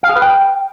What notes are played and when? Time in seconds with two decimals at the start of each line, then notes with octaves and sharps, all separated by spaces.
0.03 F5
0.09 G#4
0.16 B4
0.22 G5